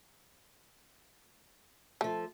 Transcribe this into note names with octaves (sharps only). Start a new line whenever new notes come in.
F3 A3 A4